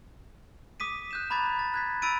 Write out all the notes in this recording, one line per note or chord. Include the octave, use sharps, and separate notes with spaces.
D6 D#6 B6 D#7
F#6 G6 E7
A#5 B5 D6 G#6 A6 B6
A6
F#6 G#6 B6
B5 E6 A6 D7 D#7